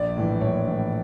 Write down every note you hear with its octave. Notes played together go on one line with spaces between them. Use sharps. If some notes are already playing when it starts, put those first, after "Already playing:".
Already playing: A#1 D5
A2 E3
A#1 C#5
A2 E3